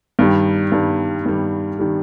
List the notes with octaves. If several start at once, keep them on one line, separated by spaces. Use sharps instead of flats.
G2 D#3 G3
G2 D#3 G3
G2 D#3 G3
D#3 G3